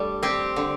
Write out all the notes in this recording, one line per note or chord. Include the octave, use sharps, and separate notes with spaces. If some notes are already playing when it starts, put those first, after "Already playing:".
Already playing: G3 A3 D4 A4
C4 G4
D3